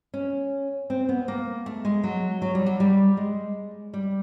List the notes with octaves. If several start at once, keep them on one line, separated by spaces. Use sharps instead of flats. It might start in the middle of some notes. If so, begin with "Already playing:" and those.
C#4
C4
B3
A#3
A3
G#3
F#3
F#3
G3
F#3
G3
G#3
G3